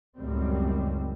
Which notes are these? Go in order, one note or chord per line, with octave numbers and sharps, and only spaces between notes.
C#2 F#2 A2 D#3 G3 C4